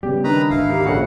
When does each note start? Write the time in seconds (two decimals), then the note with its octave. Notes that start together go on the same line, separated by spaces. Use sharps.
0.03 C#3 G3 B3 G4
0.24 D#3 D4 B4 A#5
0.50 G#1 D2 E4 F5
0.70 D#4 G4 A#4
0.86 A#1 C#3 F#4 A4 F#5